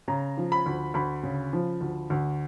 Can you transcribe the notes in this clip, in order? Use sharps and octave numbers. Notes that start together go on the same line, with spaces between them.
C#3 A#5
F3
B5
D2
D2 B5
C#3
F3
D2
D2